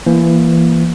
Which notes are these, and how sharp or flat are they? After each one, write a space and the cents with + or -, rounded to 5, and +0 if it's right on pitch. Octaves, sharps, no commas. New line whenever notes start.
E3 +25 A#3 +15